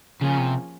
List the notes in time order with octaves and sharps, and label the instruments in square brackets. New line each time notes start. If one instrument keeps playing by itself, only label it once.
[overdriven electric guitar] C#3 [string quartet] F3 A#3 C#4 F4 G#4
[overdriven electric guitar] C3